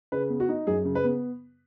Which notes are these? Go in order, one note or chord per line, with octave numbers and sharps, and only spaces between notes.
C#3 B4
B3
F#4
D#4
F#2 G#4
C#3
B4
B3